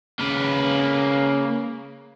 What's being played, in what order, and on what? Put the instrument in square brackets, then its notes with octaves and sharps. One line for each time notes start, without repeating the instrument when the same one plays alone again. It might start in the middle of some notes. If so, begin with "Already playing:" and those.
[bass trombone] C#3 [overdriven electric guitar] A#3 B4